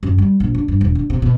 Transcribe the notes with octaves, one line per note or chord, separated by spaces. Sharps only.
F#2
G3
A#1
D3
G2
E1
D3
C3
B2